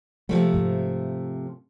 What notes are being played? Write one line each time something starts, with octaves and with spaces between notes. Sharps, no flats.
C3 F3 G#3 A3
G#2